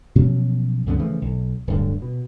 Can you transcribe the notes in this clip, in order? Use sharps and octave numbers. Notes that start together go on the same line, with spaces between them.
B2 F3 F#3 C#4
C#2 F#2 D3 B3
C#3 E3 F3 A3
B1
D1 G2 D3
B2